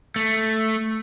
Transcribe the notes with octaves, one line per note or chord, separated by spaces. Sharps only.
A3